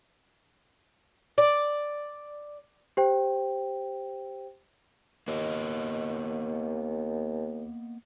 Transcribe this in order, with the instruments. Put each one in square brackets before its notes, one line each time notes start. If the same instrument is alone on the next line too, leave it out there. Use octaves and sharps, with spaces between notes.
[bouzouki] D5
[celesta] G4 C5 G5
[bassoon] D#2 [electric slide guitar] A#3 B3 D#5